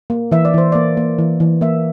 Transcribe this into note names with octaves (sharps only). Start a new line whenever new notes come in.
A#3
E3 E5
D5
E3 C5
A#3 D5
A#3
E3
E3
A#3 E5